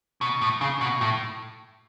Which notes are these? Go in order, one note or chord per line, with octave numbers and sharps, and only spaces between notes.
B2
A2
C#3
B2
A2